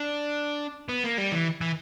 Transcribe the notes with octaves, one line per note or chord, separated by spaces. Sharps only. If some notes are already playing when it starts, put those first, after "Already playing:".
Already playing: D4
B3
A#3
G3
E3
E3